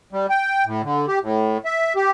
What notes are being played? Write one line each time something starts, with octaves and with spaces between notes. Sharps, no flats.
G3
G5
A2
D3
G4
A2
E5
G4